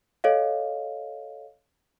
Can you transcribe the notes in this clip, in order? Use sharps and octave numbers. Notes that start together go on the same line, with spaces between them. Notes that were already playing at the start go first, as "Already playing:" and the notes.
A4 C#5 D#5 F5